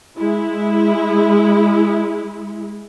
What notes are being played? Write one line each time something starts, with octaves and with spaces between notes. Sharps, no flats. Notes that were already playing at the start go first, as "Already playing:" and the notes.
G#3 E4